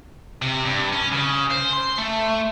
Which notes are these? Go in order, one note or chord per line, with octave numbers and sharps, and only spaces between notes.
C3
G2
C#4
C#3
C5
C6
A3